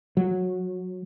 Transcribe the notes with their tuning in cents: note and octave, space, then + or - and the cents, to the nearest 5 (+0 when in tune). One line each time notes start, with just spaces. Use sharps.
F#3 -15